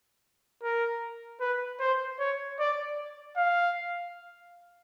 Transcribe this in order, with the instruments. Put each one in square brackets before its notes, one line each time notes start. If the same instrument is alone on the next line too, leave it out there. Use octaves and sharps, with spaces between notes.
[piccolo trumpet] A#4
B4
C5
C#5
D5
F5